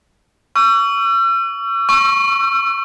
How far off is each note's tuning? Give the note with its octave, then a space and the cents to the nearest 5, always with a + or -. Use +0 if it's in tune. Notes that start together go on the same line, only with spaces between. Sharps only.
C#6 +30 E6 +45
C#6 -10 E6 +35